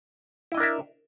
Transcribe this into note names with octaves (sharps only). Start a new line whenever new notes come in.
D4 E4 A#4 D#5 E5